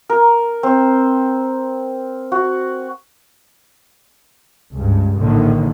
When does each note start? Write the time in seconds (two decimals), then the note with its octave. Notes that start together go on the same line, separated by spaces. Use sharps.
0.09 A#4
0.63 C4
2.32 F#4
4.73 C#2 G2
5.18 A#1 A2 D3 D#3